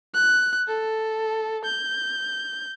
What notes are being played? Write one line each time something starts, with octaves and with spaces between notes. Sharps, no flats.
F#6
A4
G6